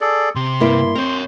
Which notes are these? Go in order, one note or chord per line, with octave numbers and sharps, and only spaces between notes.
G#4 A4 D5
C3 C6
G2 A#3 E4
C4 A#4 C#5